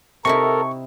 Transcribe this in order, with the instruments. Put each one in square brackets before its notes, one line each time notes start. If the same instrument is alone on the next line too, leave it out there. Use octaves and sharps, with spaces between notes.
[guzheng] C3 D#4 E4 [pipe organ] A4 A#4 [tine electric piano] C#6